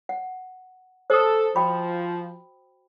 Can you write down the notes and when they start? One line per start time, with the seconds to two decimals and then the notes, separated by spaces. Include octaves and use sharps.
0.09 F#5
1.10 A4 C5 D#6
1.56 F3 F#4 G5 B5